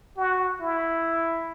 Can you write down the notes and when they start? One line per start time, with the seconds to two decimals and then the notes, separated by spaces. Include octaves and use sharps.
0.17 F#4
0.61 E4